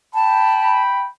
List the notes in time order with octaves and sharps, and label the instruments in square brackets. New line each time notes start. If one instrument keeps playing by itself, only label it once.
[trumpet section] G5 B5 [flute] A5